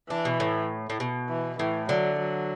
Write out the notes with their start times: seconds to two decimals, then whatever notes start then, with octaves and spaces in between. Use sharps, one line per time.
0.10 E3 D4
0.25 B2
0.40 A2
0.90 A2
1.00 B2
1.29 E3
1.59 A2 E3
1.89 D3 F#3
2.19 F#3